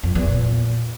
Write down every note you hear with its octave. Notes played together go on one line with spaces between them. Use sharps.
F2
E2
A#2